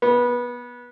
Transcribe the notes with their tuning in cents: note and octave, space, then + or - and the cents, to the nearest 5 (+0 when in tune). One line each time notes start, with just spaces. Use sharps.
B3 -20